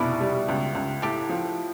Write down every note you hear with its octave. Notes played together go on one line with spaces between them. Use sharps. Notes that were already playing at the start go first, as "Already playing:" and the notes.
Already playing: F1 B2 D4 E4
G3
C#2
C#2
A2 G4 A4
F3